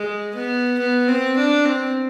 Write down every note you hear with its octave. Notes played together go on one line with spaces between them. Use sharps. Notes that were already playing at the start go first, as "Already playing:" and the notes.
Already playing: G#3
B3
B3
C4
D4
C4